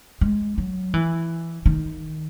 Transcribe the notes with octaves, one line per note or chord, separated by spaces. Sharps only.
G#3
F#3
E3
D#3